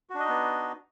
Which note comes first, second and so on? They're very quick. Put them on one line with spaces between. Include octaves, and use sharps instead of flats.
F#4 D4 D#5 D#4 B3